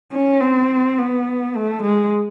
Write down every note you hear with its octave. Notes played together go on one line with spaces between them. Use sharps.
C#4
C4
B3
A3
G#3